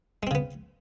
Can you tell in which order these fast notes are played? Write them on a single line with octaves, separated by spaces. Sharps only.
G#3 C4 C#3 B3